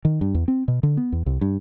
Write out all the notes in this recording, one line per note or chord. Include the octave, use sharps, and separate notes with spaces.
D#3
G2
E2
C4
B2
D3
B3
E2
C2
G2